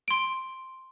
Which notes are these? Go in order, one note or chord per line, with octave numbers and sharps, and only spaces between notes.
C6 D7